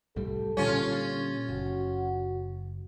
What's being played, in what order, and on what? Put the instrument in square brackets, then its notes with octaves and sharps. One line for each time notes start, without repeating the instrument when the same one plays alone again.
[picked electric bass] C2 A2 G3 [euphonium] A4
[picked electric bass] A#2 D3 G3 [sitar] C#4 F4
[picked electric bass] F#1 [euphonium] F#4